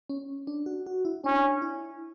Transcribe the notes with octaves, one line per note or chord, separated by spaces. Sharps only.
C#4
D4
F#4
F#4
E4
C#4 D4
E4